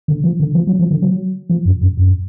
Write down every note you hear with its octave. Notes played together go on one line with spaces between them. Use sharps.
D3
F3
D3
F3
F#3
F3
D3
F#3
F3
F#2
F#2
F#2